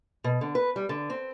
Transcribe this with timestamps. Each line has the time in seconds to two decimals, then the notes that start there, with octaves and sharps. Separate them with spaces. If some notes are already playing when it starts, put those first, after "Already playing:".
0.24 B2
0.41 D3
0.55 B4
0.76 G3
0.89 D3
1.10 C4